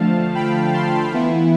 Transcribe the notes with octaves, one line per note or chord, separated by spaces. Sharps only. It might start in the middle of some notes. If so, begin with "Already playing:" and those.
Already playing: D3 F3 A3 F5 A5
G5 B5
A5 C6
E3 B3 E4